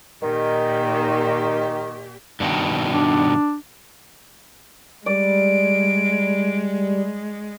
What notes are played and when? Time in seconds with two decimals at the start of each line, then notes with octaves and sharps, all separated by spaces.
0.23 A#2 D#3 G4
2.40 G2 B2 D#3
2.92 D4
5.06 G3 G#3 D5 D7